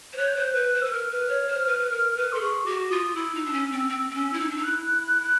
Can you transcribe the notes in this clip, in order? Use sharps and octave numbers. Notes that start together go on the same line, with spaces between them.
C5
C#5 F#6
G6
C5 F#6
G6
B4 F#6
C5
B4 E6
A#4 F6
B4
C#5
C5
B4
B4
A#4
B4
A4 C6
G#4 C#6
F#4 D6
F4 D#6
E4 E6
D#4
D4
C#4
C4
C4
C4
C#4
E4
D#4
D4
D#4
E4 F#6